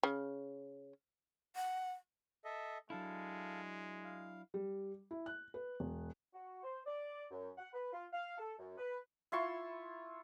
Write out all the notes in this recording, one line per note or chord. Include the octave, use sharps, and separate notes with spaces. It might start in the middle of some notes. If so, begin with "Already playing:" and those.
C#3
F#5
A4 D#5 E5
F#3 G#3 D4 E4 A4 F5
F5
G3
E4
F#6
B4
E1
F#4
C5
D5
F#2
F#5
B4
F4
F5
A4
F#2
B4
E4 F4 C6 C#6